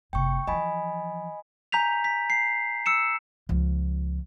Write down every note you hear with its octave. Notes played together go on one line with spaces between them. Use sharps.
F#1 C3 G5 C#6
E3 F3 D#5 G#5 B5
G#5 A#5 G6 B6 F7
B6
C7
E6 C#7 E7
C#2 F3